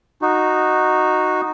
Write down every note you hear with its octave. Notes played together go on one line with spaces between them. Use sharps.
D#4 F#4